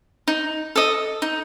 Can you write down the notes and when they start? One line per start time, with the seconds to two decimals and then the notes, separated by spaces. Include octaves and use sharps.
0.28 D#4
0.76 A4 D#5
1.22 D#4